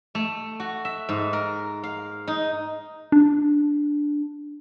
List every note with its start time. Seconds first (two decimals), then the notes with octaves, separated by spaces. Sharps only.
0.15 A3
0.60 F#4
0.85 E5
1.09 G#2
1.33 A#4
1.84 F5
2.28 D#4
3.12 D4